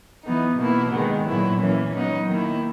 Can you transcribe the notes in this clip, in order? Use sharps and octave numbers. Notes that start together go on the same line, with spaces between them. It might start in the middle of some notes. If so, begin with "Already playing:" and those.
E3 B3 D#4
B2 A#3 E4
D#3 G#3 B3
A#2 F#3 B3 E4
E3 A#3 C#4
F#3 B3 D#4
D#3 A#3 E4